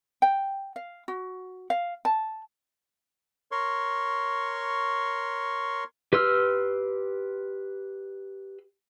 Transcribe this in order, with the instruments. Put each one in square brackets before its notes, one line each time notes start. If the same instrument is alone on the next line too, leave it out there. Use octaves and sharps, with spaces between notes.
[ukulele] G5
F5
F#4
F5
A5
[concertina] A#4 C#5 C6 C#6
[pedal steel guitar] G4 B4 C6 E6 F6